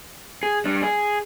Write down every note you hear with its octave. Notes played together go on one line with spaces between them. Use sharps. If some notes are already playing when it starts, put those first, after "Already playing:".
G#4
G3 D4
G#4